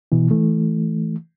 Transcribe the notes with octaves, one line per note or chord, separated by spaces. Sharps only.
B2 E3
E3 A3